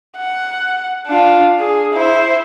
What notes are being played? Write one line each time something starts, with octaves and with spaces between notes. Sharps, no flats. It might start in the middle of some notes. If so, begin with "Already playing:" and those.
F#5
D4 F4
G#4
E4 C5